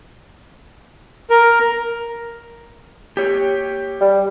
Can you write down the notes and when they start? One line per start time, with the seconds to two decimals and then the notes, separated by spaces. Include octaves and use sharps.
1.30 A#4
3.17 G4 C#5
4.01 G3